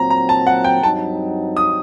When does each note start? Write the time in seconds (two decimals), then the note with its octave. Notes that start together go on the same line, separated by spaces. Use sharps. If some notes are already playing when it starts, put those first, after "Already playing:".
Already playing: A#2 F#3 C4 A#5
0.10 A#5
0.29 A5
0.47 F#5
0.64 G5
0.83 G2 F#3 C4 D#4 A5
1.57 D#6